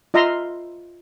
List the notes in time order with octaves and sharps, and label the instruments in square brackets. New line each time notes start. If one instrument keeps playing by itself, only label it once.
[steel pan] F4 D#5 E5 A#5 C6